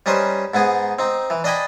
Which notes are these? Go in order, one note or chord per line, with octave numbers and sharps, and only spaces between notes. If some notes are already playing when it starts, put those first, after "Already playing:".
G3 C#4 D#4 B4 C5
G#2 B3 D#4 G#4
C4 D#4
E3
D4 D5 D#5 G5 G#5 B5